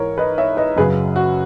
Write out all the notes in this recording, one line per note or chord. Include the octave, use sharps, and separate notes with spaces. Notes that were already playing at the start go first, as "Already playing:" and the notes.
Already playing: G#2 E3 A#4 C#5
B4 D#5
C#5 E5
B4 D#5
F#2 C#3 F#3 G#4 B4
F#4